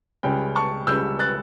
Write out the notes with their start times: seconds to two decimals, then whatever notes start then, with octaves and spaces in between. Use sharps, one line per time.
0.23 C#2 C#3 G3 C#4 G5
0.55 A5 C#6
0.87 C#2 C#3 G3 C#4 E6 G6
1.19 F#6 A6